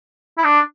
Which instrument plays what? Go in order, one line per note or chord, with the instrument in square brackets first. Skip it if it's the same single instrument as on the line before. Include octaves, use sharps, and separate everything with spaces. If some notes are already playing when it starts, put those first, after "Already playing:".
[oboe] E4
D4